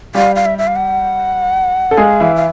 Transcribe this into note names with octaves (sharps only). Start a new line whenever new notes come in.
G3 G4 F5
F5
E5
E5
F5
F#5
A4
G#3 G#4 F5
E3 E4
F5